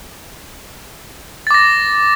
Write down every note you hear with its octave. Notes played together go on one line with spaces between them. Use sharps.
D6 A6 A#6